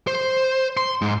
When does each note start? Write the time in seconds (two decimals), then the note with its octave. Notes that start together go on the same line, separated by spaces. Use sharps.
0.07 C5
0.77 C6
1.02 G#2